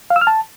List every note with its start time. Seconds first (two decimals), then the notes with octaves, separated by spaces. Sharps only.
0.10 F5
0.16 E6
0.21 F6
0.27 A5